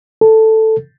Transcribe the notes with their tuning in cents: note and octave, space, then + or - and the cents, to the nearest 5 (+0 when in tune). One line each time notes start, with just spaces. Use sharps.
A4 +5